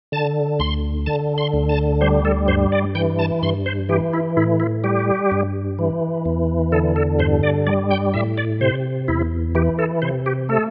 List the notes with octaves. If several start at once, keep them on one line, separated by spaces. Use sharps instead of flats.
D3 A5
D2 C6
D3 A5
C6
D2
A5
G3 C5
A4
G2 C5
D5
E3 G5
A5
G2 C6
C5
E3 G4
E4
A2 E4
E4
G3 G4
G2
E3
E2
D3 A4
A4
G2 C5
D5
G3 D5
G5
A2 E5
D5
C3 C5
E2 E4
E3 G4
A4
C3 C5
G4
A3 A4